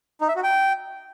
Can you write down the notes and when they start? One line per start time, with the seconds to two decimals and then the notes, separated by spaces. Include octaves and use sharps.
0.21 D#4
0.28 E5
0.36 F#4
0.43 G5